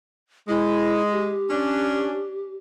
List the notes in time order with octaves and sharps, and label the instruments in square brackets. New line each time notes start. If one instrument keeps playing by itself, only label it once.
[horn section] G#3 [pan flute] E4
[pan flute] G4
[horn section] C#4 D4